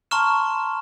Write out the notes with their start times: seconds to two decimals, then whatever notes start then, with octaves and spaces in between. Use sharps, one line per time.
0.11 A5 A#5 C6 C#6 F6 E7